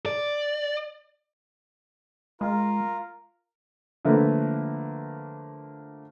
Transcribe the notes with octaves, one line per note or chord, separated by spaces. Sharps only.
D5
G#3 F4 A#4
D3 F3 A3 A#3 A#4 B4